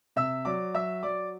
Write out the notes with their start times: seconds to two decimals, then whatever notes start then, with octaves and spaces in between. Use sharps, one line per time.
0.16 C3 E5 E6
0.45 F#3 D5 D6
0.74 F#3 E5 E6
1.03 F#3 D5 D6